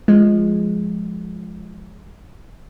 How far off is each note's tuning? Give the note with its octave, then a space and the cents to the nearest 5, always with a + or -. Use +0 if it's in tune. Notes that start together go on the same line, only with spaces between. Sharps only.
F3 +0 G#3 +0